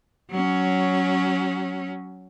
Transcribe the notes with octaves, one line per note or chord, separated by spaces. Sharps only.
F#3 C#4